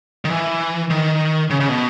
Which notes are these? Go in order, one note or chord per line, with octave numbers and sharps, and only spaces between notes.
D#3
E3
D#3
C#3
C#3
B2